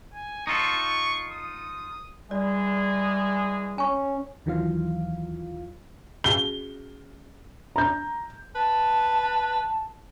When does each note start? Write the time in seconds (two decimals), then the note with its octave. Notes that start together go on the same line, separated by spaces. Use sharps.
0.14 G#5
0.47 D#4 F4 A4 C#6
1.32 D#6
2.31 E3 G3 G#3 G#4 D5
3.78 C#4 G#5 C#6
4.46 D#2 D#3 E3 F#3 F4 F5
6.24 C#4 F#4 G#4 G7
7.76 A#5 G6
8.55 B4 A5